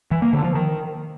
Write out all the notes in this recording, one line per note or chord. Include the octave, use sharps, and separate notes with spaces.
E3
A#3
D3
F3
D#3